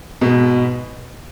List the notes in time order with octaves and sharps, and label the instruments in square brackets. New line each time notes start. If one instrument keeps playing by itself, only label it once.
[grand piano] G#2 B2 B3